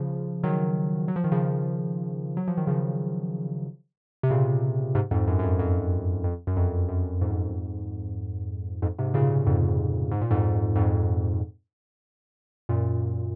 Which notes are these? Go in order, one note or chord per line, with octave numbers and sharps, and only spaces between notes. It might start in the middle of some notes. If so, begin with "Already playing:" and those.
Already playing: C#3 F3
D#3 F#3
F#3
F3
D#3
C#3 F3
F#3
F3
D#3
C#3 F3
C3
A#2 C#3
G#2 C3
F2 G#2
F#2
F#2
F2
F2
F2
F#2
F2
F#2
F2 G#2
F2 G#2
G#2 C3
A#2 C#3
F2 G#2
G#2
A#2
F2 G#2
F2 G#2
F#2 A#2